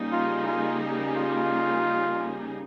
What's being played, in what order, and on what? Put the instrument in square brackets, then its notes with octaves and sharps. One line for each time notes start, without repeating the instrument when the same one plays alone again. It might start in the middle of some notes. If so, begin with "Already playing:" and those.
Already playing: [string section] C#3 G3 A#3 D#4 G#4
[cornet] F4
F4
F4